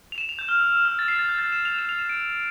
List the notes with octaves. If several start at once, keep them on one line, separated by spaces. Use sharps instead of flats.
F7
E7
F7
G6
F6
E6
E6
F6
A6
C7
A6
G6
A6
E7
F7
E7
F7
E7
D7